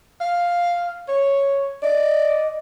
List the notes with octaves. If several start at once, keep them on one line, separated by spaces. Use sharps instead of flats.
F5
C#5
D5 D#5